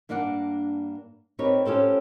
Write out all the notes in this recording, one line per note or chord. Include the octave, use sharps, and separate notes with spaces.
G2 A#3 D4 D5 F#5
C4 D#4 G4 A#4 B4 C#5
C#4 F4 G4 A4 C5